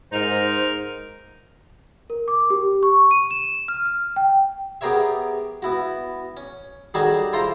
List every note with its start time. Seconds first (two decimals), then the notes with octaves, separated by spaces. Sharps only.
0.12 G#2 D#4 A#4 C5
2.10 A#4
2.28 D6
2.50 G4
2.83 C#6
3.11 D#7
3.31 E7
3.68 F6
3.86 F6
4.16 G5
4.81 B3 G4 G#4 A#4 C#5 E5
5.62 B3 E4 F#4
6.37 C#4
6.94 D#3 G3 F#4 G#4 A4 C#5
7.33 E4 F4 A4 C5 A#5